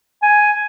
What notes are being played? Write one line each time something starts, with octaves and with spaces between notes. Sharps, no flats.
G#5